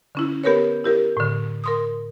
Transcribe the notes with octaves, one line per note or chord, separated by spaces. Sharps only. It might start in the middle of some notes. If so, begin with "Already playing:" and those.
D3 C#4 E4
B3 G4 A#4 B4 C#5
E4 G4 A#4
A2 D3
A#4 C6 D#6